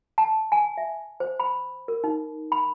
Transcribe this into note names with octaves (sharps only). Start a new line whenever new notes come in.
A5
G#5
E5
C5
B5
A#4
D#4
B5